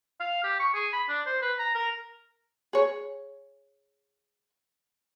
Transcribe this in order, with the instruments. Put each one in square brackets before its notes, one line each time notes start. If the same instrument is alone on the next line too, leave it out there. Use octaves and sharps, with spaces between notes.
[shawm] F5
G4
C#6
G#4
B5
D4
C5
B4
A#5
A#4
[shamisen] G#4 C#5